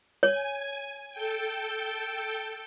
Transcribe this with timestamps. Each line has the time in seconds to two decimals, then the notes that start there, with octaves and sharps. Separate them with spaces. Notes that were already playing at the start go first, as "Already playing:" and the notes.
0.23 C#5 G#5
1.12 A4 G5